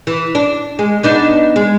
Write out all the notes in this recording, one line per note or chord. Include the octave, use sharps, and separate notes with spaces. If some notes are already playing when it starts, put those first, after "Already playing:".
E3
D4
G#3
B3 D4 D#4
G#3